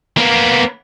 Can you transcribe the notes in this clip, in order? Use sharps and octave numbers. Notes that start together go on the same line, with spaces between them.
A#3 B3